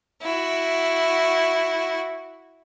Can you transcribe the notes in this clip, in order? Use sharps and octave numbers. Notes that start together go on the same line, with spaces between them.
E4 F#4